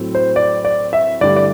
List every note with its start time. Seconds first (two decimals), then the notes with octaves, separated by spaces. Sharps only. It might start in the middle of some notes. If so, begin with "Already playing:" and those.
Already playing: A2 F#3 C4
0.15 C5
0.36 D5
0.65 D5
0.93 E5
1.21 G2 D3 A3 E4 G4 D5
1.36 D5